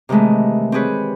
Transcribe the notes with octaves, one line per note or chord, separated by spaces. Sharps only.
C3 D#3 E3 G#3 A3
C4 G4 G#4 B4 C#5